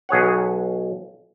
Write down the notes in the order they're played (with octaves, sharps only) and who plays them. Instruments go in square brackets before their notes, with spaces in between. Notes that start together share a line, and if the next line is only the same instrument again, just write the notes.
[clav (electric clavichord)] B1 G#4 C#5 F#5